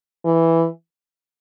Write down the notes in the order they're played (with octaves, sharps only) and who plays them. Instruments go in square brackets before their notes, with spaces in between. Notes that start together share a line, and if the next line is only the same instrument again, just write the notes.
[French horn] E3